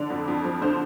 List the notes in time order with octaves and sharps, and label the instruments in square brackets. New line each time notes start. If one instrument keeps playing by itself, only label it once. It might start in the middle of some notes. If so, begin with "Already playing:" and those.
Already playing: [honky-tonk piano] D3 D5
F2
F2
F3
D3 C5